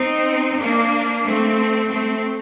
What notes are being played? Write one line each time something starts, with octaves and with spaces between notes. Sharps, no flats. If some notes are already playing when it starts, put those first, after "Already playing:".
Already playing: C4 D#4
A#3 D4
A3 C4
A3 C4